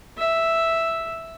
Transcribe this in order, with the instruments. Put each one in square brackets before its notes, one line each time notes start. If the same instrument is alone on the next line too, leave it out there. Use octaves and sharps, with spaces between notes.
[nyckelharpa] E5